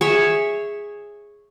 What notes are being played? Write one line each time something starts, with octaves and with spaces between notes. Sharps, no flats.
G#4 C#5 E5